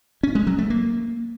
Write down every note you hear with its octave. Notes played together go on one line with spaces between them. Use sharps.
C#4
G#3
F#3
A3
A#3